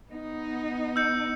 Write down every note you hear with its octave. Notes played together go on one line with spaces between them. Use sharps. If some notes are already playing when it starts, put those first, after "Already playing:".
B3 D#4
E6 G6 C#7